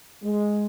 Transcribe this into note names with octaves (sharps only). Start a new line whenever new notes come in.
G#3